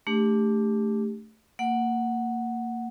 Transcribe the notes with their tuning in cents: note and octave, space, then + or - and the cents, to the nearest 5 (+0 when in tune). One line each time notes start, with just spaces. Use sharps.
A3 +0 D4 -5 G4 +25
A#3 -20 F#5 +0